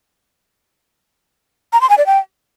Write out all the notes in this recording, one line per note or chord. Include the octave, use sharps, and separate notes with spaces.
A#5
C6
G#5
D5
G5